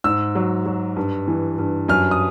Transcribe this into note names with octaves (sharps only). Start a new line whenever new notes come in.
G#2 E6
F#3
F#3
G2
E3
G2
F#2 F6
D#6